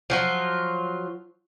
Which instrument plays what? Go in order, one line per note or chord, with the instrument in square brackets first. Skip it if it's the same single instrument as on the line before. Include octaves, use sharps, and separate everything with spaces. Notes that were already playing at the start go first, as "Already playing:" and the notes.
[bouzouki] F3 F#3 F4